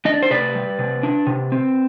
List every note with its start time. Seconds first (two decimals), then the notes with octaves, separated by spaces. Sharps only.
0.05 D4 D#5
0.14 D5
0.23 C5
0.31 C3 B4 D5
0.55 G3
0.79 C3
1.03 D4
1.27 C3
1.52 C4